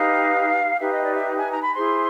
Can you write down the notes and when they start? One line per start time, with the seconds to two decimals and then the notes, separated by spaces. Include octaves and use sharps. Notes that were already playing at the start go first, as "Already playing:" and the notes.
Already playing: D#4 G4 B4 F5
0.80 D#4 G4 B4 E5
0.91 D#5
1.04 D5
1.15 E5
1.38 G#5
1.52 A#5
1.63 B5
1.74 E4 G#4 C5 C6